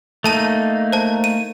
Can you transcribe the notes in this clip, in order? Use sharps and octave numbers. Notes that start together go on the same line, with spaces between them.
A3 A#3 D#4 A4 A5 D#7
C5 A5
D#7